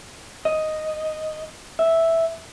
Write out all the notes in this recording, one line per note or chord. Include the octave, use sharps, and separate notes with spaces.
D#5
E5